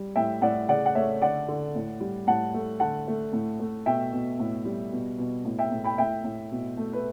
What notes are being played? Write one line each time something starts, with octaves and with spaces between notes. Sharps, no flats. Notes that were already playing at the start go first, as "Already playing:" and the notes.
Already playing: G3
A2 E5 G5
A2 D5 F#5
C#3 D5 F#5
F#5
A3 C#5 E5
D3 D5 F#5
D3
A2
G3
A2 F#5 A5
A3
D3 F#5 A5
A3
A2
A3
B2 E5 G5
B2
A2
G3
B2
B2
A2
E5 G5
A2
G5 B5
A2 E5 G5
A2
B2
A3
B4